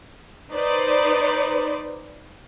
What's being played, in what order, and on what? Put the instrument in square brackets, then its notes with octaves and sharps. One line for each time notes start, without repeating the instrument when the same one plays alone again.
[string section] D#4 B4 C5 D5